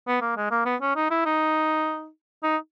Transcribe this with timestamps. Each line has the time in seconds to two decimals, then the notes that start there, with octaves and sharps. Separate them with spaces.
0.08 B3
0.21 A#3
0.37 G#3
0.51 A#3
0.66 B3
0.81 C#4
0.96 D#4
1.11 E4
1.26 D#4
2.43 D#4